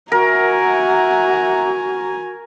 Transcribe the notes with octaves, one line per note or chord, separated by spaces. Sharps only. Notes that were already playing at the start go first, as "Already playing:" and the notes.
F#4 A#4 E5 F#5 G#5 A#5